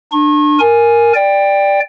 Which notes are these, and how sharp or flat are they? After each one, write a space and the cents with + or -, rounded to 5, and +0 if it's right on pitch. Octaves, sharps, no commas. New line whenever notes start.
D4 +20 C#6 -40
A#4 +0 G#5 +0
D5 +0 G5 +15